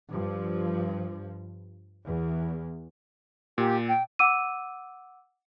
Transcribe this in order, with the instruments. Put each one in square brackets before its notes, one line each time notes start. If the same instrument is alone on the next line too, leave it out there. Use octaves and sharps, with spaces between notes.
[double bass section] G2 F3
E2
[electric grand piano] A#2 [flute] G4
[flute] G5
[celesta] F#5 D6 E6 D#7